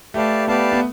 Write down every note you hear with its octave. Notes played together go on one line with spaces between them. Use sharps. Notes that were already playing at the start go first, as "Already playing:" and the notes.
A3 G4 B4 D5 F5 A5
B3 G4 B4 D5 F5 A5
B3